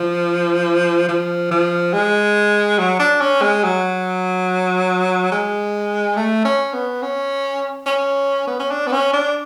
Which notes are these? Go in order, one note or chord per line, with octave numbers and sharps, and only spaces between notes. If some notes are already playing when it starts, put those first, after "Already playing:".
Already playing: F3
F3
F3
G#3
F#3
D4
C#4
G#3
F#3
G#3
A3
C#4
B3
C#4
C#4
B3
C#4
D4
B3
C#4
D4